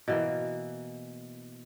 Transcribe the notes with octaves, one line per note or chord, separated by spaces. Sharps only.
B2 E3 A#3